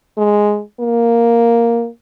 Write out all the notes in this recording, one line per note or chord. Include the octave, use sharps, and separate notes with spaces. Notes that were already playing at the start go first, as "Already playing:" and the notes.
G#3
A#3